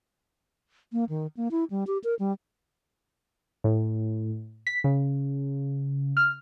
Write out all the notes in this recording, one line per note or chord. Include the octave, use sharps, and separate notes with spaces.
A#3
D#3
A#3
E4
G3
G4
A#4
G3
A2
B6
C#3
F6